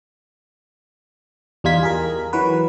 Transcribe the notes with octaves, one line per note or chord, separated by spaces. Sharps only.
E2 G3 D#4 F4 G#6 B6
G#4 A#4
E3 F#3 F#4 B4